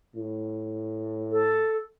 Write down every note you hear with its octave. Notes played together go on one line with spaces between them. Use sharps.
A2
A4